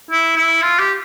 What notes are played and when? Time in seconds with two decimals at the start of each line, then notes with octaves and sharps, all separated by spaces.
0.10 E4
0.36 E4
0.62 F4
0.79 G4